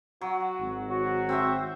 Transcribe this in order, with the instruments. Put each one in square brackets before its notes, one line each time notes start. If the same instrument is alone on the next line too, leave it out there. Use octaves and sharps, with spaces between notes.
[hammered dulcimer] F#3 [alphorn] F#4
[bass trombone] G#1
[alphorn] F#3 [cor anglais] F#4
[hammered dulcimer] C4 C5 E5